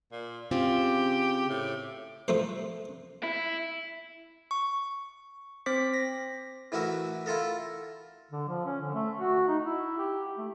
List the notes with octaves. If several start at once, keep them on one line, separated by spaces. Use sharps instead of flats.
A#2
C#3 C4 F4 G4
A2
F3 A3 C5
E4
C#6
C4 C5 D6 B6
A#6
A2 E3 E4 F#4 A#4 E5
E4 F4 A4 A#4
D3
F3
C#4
D3
A3
F#4
D#4
E4
G4
A3